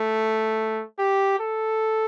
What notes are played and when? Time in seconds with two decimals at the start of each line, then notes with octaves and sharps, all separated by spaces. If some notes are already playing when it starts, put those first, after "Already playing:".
Already playing: A3
0.99 G4
1.39 A4